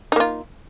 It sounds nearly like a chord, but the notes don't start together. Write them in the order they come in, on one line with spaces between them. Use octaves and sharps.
D#4 A#3 F4